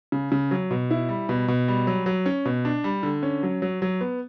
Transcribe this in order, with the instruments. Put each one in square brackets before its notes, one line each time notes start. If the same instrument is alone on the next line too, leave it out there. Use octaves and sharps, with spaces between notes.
[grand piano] C#3
C#3
F#3
B2
E4
G3
B2
B2
G3
F#3
F#3
C#4
B2
D4
G3
D3
C#4
F#3
F#3
F#3
B3